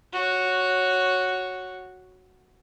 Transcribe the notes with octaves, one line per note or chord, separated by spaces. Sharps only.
F#4 C#5